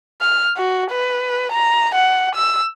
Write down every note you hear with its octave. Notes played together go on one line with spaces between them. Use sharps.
F6
F#4
B4
A#5
F#5
E6